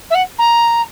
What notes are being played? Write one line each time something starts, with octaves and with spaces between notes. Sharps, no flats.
E5
F#5
A#5